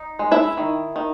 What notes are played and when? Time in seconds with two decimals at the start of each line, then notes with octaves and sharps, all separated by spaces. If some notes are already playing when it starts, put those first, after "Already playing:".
Already playing: D#4
0.19 G#3
0.32 E4 E5
0.57 D#3
0.96 D#3